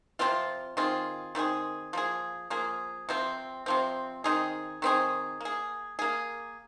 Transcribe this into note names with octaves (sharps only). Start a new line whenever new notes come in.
C3 F3 C4 F4
D#3 C4 F4 G#4
D#3 C4 F4 G#4
F3 A#3 G#4
F3 A#3 G#4
C3 F3 C4
C3 F3 C4
D#3 C4 D#4 G#4
D#3 C4 D#4 G#4
A#3 G#4
A#3 G#4